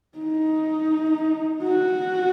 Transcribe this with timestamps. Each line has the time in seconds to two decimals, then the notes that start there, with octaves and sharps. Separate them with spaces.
0.18 D#4
1.63 F#4